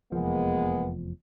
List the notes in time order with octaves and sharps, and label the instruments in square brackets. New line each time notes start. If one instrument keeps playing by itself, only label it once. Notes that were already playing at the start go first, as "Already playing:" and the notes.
[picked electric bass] F1 E2 F3 [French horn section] G#3 A#3 B3